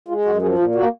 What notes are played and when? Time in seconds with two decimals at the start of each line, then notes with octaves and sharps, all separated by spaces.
0.08 G#3 F4
0.25 F#2 F#4
0.41 F3 G#4
0.58 A#2 F4
0.75 A#3 F#4